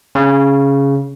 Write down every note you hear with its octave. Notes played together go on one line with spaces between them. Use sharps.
C#3